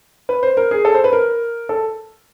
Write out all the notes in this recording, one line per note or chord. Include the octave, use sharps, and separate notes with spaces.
B4
C5
A#4
G#4
A4
C5
B4
A#4
A4